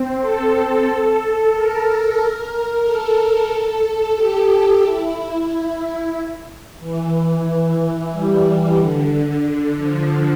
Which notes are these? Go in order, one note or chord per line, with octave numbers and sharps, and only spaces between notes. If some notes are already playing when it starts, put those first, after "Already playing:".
Already playing: C4
A4
A#4
A4
G4
E4
E3
G3
G3
D3
D3
F3